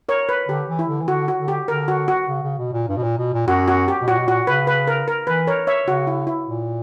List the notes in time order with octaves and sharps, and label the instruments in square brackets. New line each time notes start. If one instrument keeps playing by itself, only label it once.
[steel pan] A#4 C#5
B4
[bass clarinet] D3 [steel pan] G4
[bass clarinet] E3
[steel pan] E4
[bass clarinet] D3
E3
[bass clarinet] D3 [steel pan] F#4
[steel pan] F#4
[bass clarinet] D3
[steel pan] G4
[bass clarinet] D3 [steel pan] A#4
[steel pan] F#4
F#4
[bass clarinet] C#3
C#3
B2
A#2
G2
B2
A#2
B2
A#2
[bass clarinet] F#2 [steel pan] F#4
[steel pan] F#4
G4
[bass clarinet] B2
[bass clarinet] A#2 [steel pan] F#4
[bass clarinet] B2
[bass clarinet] A#2 [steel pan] F#4
[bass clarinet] C#3 [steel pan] B4
[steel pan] B4
A#4
A#4
[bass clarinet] E3 [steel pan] B4
[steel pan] A#4 C#5
C#5 E5
[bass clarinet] C#3 [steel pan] F#4
[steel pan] E4
E4
[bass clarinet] A#2